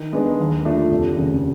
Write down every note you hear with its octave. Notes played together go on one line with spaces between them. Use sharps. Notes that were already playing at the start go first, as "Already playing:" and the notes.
Already playing: D#3
G#3 B3 D4
D#2
D3 F3 A3 D4
F1
D#2 C#3